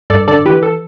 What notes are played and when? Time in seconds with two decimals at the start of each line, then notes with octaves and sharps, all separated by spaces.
0.10 G2 A4 D5
0.28 D3 A4 D5
0.45 E3 G4 B4
0.63 A4